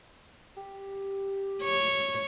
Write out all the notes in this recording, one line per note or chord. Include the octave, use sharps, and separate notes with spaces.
G4
C#5